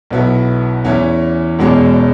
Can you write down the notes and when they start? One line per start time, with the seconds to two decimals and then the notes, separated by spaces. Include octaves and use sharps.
0.11 B1 B2 B3 E4
0.84 E2 E3 C#4 E4
1.59 E1 E2 B2 G#3 C#4